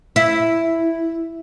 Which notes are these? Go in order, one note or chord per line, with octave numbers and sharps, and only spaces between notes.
E4